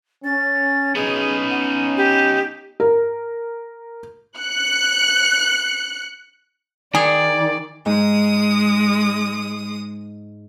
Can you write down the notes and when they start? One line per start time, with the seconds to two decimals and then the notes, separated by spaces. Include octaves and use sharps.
0.25 C#4 A6
0.95 B3 C#4 D#4 G#4
1.50 F#5
1.97 G4
2.80 A#4
4.38 F#6 C#7
6.95 D#3 G#4 D5
7.86 G#2 G#3 D#6